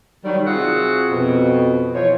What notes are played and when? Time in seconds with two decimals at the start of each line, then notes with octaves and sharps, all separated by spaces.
0.24 D#3 F#3 G3
0.47 C3 F4 F#4 G#4 E5 F#5
1.10 F2 B2
1.94 E3 F3 C5 C#5